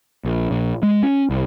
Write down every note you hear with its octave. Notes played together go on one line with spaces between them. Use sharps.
A#1
A#1
G#3
C#4
C2